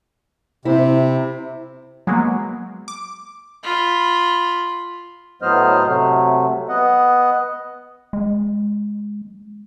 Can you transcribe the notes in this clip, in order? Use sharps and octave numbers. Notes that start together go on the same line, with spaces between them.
C3 C4 E4
F#3 G#3 A#3 B3
D6
F4 B5
A2 F#3 B3 C5 D#5 F6
C3 F#3 A3
B3 D#5 F#5
G#3